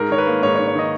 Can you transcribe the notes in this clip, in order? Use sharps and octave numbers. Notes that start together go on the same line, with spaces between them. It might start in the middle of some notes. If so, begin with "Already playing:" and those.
Already playing: G#2 A#4
D#3 C#5
B4
A#3
G#2 C#5
C#5
G#2
C#5
D#3 D#5